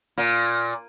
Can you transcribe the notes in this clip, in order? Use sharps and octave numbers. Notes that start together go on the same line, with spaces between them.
A#2